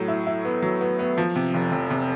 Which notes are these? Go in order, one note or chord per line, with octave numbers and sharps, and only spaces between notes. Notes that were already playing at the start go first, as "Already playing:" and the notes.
Already playing: A2 F#3
E4
E4
B3
F#3
B3
B3
F3
C3
F1
F1
C3